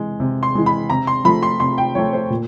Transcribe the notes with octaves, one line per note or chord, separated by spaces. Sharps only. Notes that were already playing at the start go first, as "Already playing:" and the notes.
Already playing: C3 E3 G#3
C3
C6
E3 G#3
B5
C3 A#5
C6
F3 A3 B5
C6
C3 C6
G5
F3 A3 C#5
C5
A#2